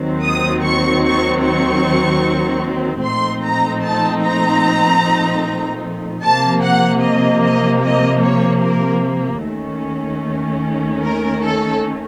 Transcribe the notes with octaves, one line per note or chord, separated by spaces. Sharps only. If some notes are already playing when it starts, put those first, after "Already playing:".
Already playing: D#2 D#3 F#3 C4
D#6
C#6
C#6
C#6
A#2 F3 A3 C4 D#4 C6
A#5
A5
A#5
C3 F3 A#3 A5
F#5
D#5
D#5
D#5
C#5
A#4
D#2 D#3 A3 C#4
A#4
A4